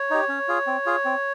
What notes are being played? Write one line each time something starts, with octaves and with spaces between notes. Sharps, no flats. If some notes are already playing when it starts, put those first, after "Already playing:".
Already playing: C#5
D#4 G4
C#4
F4 G#4
C4
F4 G#4
C4